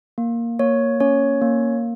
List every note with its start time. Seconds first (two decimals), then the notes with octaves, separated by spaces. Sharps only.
0.18 A#3
0.59 A#3 C#5
1.00 C#4 C#5
1.42 A#3